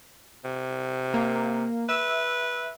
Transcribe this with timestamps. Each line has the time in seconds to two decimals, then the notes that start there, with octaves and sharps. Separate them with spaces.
0.45 C3
1.14 A#3
1.89 B4 E5 E6